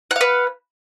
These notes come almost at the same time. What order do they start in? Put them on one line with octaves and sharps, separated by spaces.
F#5 F5 B4